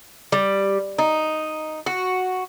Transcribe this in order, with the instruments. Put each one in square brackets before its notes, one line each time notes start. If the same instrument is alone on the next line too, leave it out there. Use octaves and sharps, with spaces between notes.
[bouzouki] G3
D#4
F#4